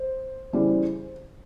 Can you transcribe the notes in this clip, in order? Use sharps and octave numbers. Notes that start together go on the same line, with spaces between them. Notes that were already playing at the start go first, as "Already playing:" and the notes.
Already playing: C5
C#3 E3 G3